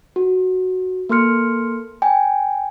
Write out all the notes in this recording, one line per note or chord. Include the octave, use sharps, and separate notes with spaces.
F#4
A#3 A4 C6 F6 C#7
G5 G#5